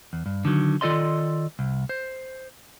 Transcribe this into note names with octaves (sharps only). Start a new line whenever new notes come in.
E2
G2
D3 D#3 F#3
D#3 F4 A4 D5 D#5 C6
C2
C5